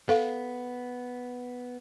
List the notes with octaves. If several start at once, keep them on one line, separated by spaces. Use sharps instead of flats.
B3 A4 F5